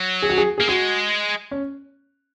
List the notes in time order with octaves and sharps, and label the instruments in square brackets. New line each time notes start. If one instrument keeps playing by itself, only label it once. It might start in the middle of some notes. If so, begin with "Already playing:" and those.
Already playing: [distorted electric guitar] F#3
[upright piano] G#4
F#4
G#4
[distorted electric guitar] A#3 [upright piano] G#4
[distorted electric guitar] G#3 [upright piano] F#4
[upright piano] C#4